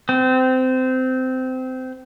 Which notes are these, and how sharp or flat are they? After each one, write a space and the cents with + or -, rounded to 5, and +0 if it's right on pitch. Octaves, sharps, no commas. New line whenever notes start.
C4 -20